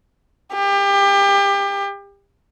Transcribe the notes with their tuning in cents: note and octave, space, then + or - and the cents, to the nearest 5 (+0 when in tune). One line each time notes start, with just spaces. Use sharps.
G4 +30